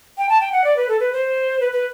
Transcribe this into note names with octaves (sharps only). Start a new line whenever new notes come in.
G5
A5
G5
F#5
D5
B4
A4
B4
C5
B4
B4